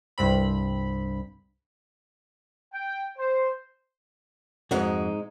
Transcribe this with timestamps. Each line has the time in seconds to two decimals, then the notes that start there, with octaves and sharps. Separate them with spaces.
0.18 C2 G2 C4 B5
2.72 G5
3.17 C5
4.71 F2 G#2 G#3 D#4 F#4